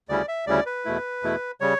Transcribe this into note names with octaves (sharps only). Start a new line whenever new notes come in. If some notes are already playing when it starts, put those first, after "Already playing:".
D2 C#3 G3 C#4 E4 D5
E5
D2 C#3 G3 C#4 E4 D5
B4
E2 B2 A3 E4
E2 B2 A3 E4
C#3 G3 C#5